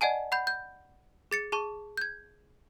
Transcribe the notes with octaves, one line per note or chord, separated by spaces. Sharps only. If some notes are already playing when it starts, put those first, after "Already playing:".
D5 D#5 F#5 G#5 A5
F#5 B5 G6
G6
G#4 A6 C#7
G#4 A5 C#6
G6 G#6